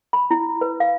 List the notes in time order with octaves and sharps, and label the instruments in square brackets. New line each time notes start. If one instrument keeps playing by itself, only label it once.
[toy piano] B5
E4
B4
F5